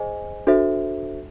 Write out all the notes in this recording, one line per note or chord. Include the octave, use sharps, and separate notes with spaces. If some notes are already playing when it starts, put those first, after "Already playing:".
Already playing: G#4 C5 D#5 G#5
D4 F#4 A4 C5 E5